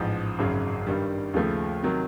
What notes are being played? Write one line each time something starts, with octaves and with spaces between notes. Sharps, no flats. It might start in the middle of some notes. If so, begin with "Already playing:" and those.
Already playing: A1 G#2 F3
G#1 F#2 C#3 F#3
G2 D#3 G3
D#2 C#3 F3 A3
C3 D#3 F#3